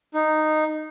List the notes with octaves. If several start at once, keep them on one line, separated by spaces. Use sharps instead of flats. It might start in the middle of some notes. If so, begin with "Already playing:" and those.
D#4